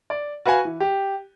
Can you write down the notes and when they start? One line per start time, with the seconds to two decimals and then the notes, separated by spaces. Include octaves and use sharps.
0.10 D5
0.46 F#4 B4 F5 F#5 G#5
0.65 E3
0.80 G4